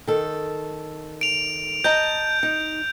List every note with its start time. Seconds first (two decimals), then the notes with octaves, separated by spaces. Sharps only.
0.07 D#3 A4
1.21 D7 F7
1.84 D#5 A5 A#5 G6
2.43 D#4